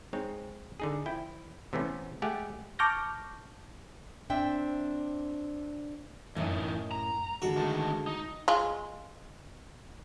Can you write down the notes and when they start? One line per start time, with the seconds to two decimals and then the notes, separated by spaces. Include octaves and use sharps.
0.13 G#3 C4 D#4 C#5
0.80 D3 D#4 G#4
1.06 F3 E4 G5
1.73 C3 E3 A3 B3 C#4
2.22 G#3 A3 G4 F#5 G#5
2.79 A5 C#6 D6 F6 G6 A#6
4.30 C4 D4 E5 G5
6.36 F#2 A2 E3 D#4
6.91 A#5
7.42 D3 G#3 F#4 A4
7.57 D#3 A3
8.07 D#4
8.48 G#3 F4